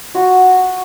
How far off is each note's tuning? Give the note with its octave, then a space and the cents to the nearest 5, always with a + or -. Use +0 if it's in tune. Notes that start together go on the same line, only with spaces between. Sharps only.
F#4 -5